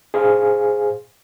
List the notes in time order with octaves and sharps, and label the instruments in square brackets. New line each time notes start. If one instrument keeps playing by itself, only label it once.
[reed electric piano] G#4 C5 F5 G#5